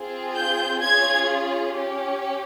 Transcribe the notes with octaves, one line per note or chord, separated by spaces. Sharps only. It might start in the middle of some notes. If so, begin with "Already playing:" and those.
Already playing: C4 F4 G#4
G6
C#4 F4 G#4 G#6
C#4 G4